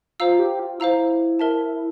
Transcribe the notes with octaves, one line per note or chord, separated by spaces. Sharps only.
F4 C5 F5 A#5 E6
G4
F4
E4 C5 F5 A#5 E6
A#4 E5 A5